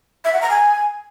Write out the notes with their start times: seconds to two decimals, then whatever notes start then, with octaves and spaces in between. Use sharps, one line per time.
0.25 E5
0.33 F#5
0.42 A#5
0.50 G#5